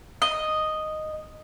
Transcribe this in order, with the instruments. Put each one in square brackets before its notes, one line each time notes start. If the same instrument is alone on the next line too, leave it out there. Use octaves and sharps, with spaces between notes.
[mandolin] D#5